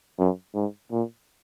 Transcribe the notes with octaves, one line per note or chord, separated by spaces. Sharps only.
F#2
G#2
A#2